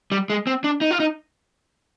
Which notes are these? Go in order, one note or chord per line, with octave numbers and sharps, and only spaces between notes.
G3
G#3
C4
D4
D#4
F4
D#4